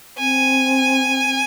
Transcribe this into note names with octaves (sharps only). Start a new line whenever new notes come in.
C4 G#5